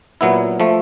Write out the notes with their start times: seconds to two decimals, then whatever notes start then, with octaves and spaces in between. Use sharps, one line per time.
0.21 A#2 F#3 B3 E4
0.60 F3 A3